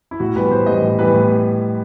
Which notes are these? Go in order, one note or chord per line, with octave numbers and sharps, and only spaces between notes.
E4
A2 F#4
E3 G3 B3 B4
A2 C5
E3 G3 B3 D#5
A2
E3 G3 B3 B4
A2